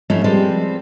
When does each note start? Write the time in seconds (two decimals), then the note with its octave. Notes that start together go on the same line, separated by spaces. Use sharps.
0.10 G#2 F3 A3 C#4 D#4 E4
0.24 F3 G3 G#3 C4 A4 B4